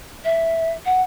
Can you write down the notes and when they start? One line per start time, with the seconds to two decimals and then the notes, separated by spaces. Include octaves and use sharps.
0.24 E5
0.85 F#5